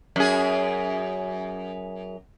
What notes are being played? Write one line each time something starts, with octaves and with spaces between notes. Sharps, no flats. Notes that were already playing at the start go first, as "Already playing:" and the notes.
F#2 G#4